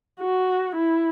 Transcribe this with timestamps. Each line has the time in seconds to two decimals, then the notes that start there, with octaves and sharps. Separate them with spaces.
0.20 F#4
0.75 E4